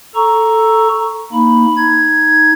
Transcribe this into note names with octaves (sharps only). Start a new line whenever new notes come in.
A4 A#5 C#6
A#3 D#4 B5
D#4 G#6